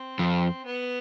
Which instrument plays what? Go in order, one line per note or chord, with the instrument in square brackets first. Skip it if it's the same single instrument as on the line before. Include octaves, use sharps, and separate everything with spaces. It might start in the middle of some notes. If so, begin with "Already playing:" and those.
Already playing: [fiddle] C4
[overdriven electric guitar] F2
[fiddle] B3